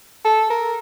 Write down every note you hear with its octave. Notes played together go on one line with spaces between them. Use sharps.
A4
A#4